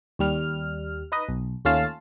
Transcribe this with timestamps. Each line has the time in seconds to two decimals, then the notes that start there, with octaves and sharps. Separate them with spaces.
0.19 D#2 G3 F6
1.12 D#4 B4 D#5
1.29 B1
1.65 D#2 A3 C#4 F4 F5 A5